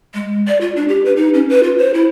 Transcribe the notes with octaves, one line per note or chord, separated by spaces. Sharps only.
G#3
D5
F4
D4
G4
B4
D#4
C#4
B4
F4
C5
E4